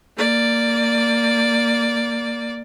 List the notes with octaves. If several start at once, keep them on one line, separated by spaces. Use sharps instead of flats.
A#3 D5